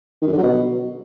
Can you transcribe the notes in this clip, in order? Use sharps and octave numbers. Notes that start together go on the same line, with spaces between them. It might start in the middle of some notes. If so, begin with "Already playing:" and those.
D#3
F#2
D3
F#3
B2